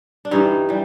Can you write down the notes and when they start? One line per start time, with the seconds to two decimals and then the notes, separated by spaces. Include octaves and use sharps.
0.25 D4
0.31 G2 E3 G3 D#4
0.69 E3 G3